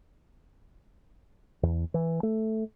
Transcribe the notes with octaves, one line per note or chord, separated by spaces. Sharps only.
E2
E3
A3